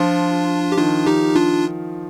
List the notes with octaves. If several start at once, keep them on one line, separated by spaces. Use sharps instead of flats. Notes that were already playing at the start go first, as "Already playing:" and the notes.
Already playing: F3 D4 F4
G4
D#3 D4 F4
D#4 G4
D4 F4